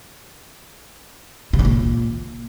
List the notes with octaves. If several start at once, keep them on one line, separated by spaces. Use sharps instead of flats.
C3
C#3
A#2